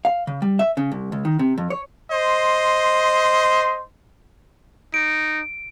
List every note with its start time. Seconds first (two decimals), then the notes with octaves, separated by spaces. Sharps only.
0.05 F5
0.27 C#3
0.42 G3
0.59 E5
0.77 C#3
0.92 C2
1.12 C#2
1.25 D#3
1.39 C3
1.58 F2
1.70 C#5
2.10 C5 D#5 C6
4.94 D#4 D7